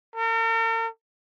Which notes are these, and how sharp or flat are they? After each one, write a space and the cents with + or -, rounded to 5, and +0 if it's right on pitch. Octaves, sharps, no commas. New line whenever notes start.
A#4 -45